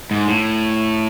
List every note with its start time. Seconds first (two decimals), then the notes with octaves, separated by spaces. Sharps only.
0.11 G#2
0.28 A2